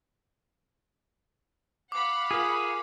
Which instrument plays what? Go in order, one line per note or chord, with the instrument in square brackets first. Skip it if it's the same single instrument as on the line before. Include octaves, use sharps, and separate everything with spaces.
[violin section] F5 F#5 B5 [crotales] D6
[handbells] F4 A#4 [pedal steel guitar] G#4